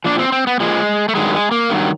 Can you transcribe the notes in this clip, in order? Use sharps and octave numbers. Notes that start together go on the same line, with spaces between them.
A#2 F3 D4
C4
C4
B3
A#2 F3 G#3
A3
G2 D#3 F#3 G#3
G#3
A#3
G2 D#3 F#3 B3